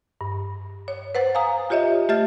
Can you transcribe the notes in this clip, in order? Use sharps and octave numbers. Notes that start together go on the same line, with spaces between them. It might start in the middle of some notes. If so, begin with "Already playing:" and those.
G2
C#5
B4 C5 F#5 A6
F5 G#5 A#5 D#6
F4 G4 C#5 D#5 E5
A3 G4 E5 F6 A6